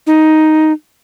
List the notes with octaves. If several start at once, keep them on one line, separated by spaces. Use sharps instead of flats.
D#4